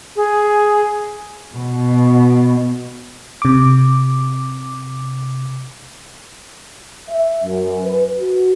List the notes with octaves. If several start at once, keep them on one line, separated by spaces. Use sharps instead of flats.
G#4
B2
C3 D6
E5
F#2
B4
F#4